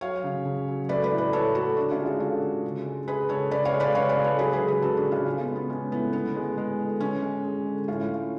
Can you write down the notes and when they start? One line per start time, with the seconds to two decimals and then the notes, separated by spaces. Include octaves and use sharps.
0.01 F#3 C#5 F5
0.24 C#3
0.45 C#3
0.68 F#3
0.89 A3 B4 D5
1.04 B4 D5
1.11 A2
1.18 B4 D5
1.33 A2 A4 C#5
1.55 A2 F#4 A4
1.77 D3 D4 F#4
1.91 C#4 F4
1.99 G#3
2.05 F4 G#4
2.20 D3 F#4 A4
2.42 D3
2.64 C#3
2.86 G#3
3.08 G#3 G#4 B4
3.29 C#3 A4 C#5
3.51 C#3 B4 D5
3.65 C#5 F5
3.73 G#3
3.80 B4 D5
3.95 C#3 C#5 F5
4.09 B4 D5
4.17 G#3
4.24 A4 C#5
4.39 F#3 G#4 B4
4.53 G#4 B4
4.60 C#3
4.68 G#4 B4
4.82 C#3 F#4 A4
4.97 D4 F#4
5.04 C#3
5.11 C#4 F4
5.26 G#3 C#4
5.41 B3
5.48 G#3
5.56 B3
5.70 G#3 C#4
5.91 A2 B3
6.13 D3 B3
6.35 G#3
6.58 G#3
6.79 D3
7.00 G#3 C#4
7.22 G#3
7.44 G#3
7.66 D3
7.88 A2 C#4 F4
8.10 A3